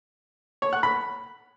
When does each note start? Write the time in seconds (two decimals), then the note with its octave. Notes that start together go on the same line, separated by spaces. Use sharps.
0.62 C#5
0.73 F#5
0.83 B5